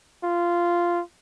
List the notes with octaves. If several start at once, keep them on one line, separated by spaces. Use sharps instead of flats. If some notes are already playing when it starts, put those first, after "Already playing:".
F4